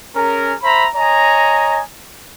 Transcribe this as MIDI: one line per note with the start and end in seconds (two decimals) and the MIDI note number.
0.15 0.54 61
0.15 0.54 68
0.15 0.54 70
0.63 0.87 72
0.63 0.87 76
0.63 0.87 82
0.63 0.87 83
0.95 1.81 73
0.95 1.81 75
0.95 1.81 80
0.95 1.81 82